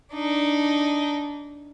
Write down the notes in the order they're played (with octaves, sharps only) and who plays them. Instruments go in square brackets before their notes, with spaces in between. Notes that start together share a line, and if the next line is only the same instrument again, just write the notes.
[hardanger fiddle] D4 D#4